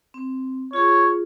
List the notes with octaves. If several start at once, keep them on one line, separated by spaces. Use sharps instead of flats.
C4
F4 G#4 C#5